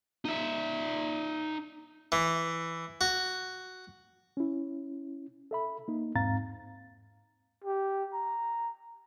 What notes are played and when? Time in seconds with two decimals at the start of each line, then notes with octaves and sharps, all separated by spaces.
0.25 D#4 E5
2.12 E3
3.01 F#4
4.37 C#4 E4
5.51 A4 E5 B5
5.88 A#3 D#4
6.15 E2 G#2 C4 F5 A#5 A6
7.64 G4
8.13 A#5